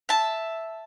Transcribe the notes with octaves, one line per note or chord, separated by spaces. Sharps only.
E5 A5